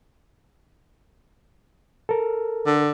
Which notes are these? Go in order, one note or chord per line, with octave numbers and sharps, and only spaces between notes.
A4 A#4
D3